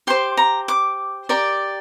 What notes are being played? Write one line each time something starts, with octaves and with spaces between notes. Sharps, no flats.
G4 C5 C6
A#5
D6
G4 A#4 D5